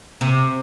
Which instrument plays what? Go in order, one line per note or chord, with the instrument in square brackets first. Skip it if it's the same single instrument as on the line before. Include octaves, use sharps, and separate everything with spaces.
[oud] C3